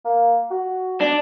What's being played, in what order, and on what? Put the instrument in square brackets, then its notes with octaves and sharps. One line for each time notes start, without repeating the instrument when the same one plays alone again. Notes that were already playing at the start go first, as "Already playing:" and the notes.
[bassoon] A#3
F#4
[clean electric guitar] D4